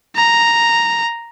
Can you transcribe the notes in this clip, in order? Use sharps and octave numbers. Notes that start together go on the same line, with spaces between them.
A#5